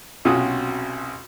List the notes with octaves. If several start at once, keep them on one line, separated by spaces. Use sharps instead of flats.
B1 C3 C#4 F4 F#4 D#6